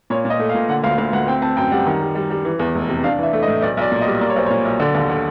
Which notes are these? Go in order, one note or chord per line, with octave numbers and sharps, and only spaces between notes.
A#2 C#5
A#2
D#5
A3
F5
A#2
D3 F#5
D2 F5
D2 F5
D2 F#5
C4 G5
C4 A5
F#2 G5
G3 F#5
D#3
G3
G3
G3
E3
E2
F1
C3
D4 F5
E3 E5
A3
D#5
A2
B1 D5
B1 D5
A#2
D#5
G3
A#3 D5
C#5
B1 C5
A#2 C#5
B1
D3 D5
D#2
D3